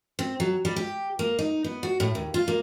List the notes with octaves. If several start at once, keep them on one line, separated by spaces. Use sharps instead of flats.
C4
F#3
G3
G4
A#3
D#4
B3
F#4
A2
D#2
F4
A#3